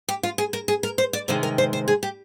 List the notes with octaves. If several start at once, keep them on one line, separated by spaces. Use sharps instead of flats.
G4
F4
G#4
A#4
G#4
A#4
C5
D5
C3 D#3 G#3 C5
A#4
C5
C5
G#4
G4